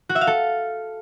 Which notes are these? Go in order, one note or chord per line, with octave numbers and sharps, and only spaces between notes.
F#4
E5
F5
A4